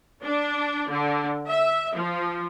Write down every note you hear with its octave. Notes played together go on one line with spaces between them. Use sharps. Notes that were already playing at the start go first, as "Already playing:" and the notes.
D4
D3
E5
F3